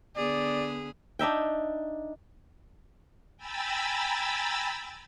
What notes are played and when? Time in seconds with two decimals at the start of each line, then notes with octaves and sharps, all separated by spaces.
0.16 D3 B3 G#4 D5
1.19 D4 D#4 E5 G5
3.37 G5 G#5 A#5 B5 E6 A6